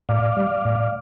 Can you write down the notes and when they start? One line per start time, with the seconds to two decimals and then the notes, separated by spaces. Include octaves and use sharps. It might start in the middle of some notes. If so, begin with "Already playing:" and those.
0.09 A2 D5 F5
0.37 G3
0.65 A2